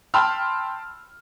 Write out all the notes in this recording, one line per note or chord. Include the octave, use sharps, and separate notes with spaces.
G5 A5 B5 C6 E6 F6